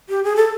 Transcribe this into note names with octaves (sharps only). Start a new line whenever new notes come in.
G4
G#4
A4